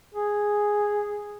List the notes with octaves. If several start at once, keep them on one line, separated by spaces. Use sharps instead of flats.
G#4